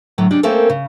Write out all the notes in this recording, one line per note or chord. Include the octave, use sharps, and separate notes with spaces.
A2 D3 F#3
C#3 G3 G#3 D4
A3 A#3 C4 C#4 A4 A#4
C#3